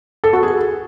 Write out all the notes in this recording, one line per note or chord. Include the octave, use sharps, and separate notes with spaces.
A4
F#4
G#4